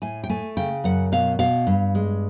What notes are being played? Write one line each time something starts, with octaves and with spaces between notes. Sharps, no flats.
A2 G#5
G5
A3 G#5
C#3 G5
F#2 F#5
B2 F5
B2 F5
G2
G#3